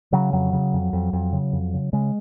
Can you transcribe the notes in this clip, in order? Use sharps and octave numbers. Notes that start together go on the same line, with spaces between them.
C#3 F#3
F2 F#3
C#3
F2
F2
F2
C#3
F2
C#3
C#3 G#3